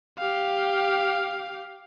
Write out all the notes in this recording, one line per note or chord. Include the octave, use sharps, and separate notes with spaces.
G4 F5